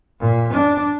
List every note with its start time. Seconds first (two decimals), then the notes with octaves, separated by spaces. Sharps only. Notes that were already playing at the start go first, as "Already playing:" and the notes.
0.20 A#2
0.52 D4